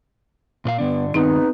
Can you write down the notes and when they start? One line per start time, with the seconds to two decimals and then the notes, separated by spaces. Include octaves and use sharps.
0.65 A#2 B4 F5
0.78 G2 D3 B3 D4
1.14 G2 D#3 G#3 B3 C4 D#4 B4